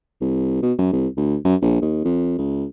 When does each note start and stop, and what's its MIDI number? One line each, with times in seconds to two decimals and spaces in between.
0.21 0.61 36
0.62 0.73 47
0.78 0.89 42
0.92 1.07 36
1.17 1.36 38
1.45 1.55 42
1.62 1.81 34
1.81 2.02 39
2.04 2.36 41
2.38 2.65 37